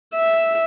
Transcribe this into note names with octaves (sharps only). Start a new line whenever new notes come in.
E5